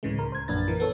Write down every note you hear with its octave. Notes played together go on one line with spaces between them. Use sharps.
D2 A2 C#3 E3 G#3
C#2 A#4
C5 G#6
A#1 F#2 A#3 D4 B4 A6
A#2 E3 A#4
B3 A4 C#5